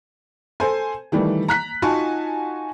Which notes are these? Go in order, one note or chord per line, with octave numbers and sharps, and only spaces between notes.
A4 C5 G#5
D#3 E3 G3 A3
A#5 F#6 B6
D#4 F4 F#4 G#5 A5 C#6